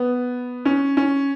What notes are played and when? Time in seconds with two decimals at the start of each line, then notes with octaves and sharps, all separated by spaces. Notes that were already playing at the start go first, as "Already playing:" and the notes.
Already playing: B3
0.65 C#4
0.97 C#4